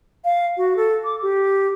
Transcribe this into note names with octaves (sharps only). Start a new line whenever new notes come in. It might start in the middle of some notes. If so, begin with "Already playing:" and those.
F5
F#4
A4
D6
G4